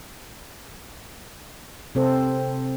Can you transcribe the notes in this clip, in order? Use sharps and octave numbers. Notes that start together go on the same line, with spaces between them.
C3 C4 A4 C5